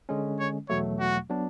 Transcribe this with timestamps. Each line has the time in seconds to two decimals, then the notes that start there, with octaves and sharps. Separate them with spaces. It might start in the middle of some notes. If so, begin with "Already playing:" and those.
0.09 D3 G#3 C#4
0.39 C#5
0.69 E2 B2 F#3 A3 C#5
1.00 F#4
1.29 F#3 B3 D4